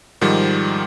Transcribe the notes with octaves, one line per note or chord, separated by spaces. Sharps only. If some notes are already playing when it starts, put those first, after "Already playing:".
G#2 D#3 F3 G3